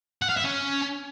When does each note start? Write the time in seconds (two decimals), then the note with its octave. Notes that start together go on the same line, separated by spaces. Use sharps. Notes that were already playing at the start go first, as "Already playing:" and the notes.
0.22 F#5
0.29 F5
0.37 E5
0.45 C#4